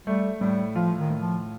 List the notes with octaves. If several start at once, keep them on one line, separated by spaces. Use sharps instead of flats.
G3 A3
A2 G3
F3 F4
D#3
A2
F3